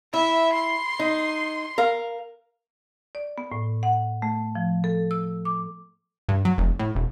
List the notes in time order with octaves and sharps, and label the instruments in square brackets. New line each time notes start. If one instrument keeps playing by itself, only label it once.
[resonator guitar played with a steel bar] E4 [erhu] E5
[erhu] C6
[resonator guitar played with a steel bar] D#4
A#4 F5
[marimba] D5
B3
A2
F#5
A3
F3
A4
E6
D6
[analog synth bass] G2
F#3
F1
A2
E1